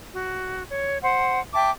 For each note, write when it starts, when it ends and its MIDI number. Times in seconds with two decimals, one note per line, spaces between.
0.13 0.64 66
0.70 0.97 73
1.03 1.39 72
1.03 1.39 78
1.54 1.70 76
1.54 1.70 79
1.54 1.70 81
1.54 1.70 86